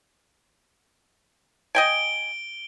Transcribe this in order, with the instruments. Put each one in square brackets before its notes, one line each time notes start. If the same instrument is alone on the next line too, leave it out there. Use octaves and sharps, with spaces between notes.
[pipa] D#5 G5 G#5 [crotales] D7 G7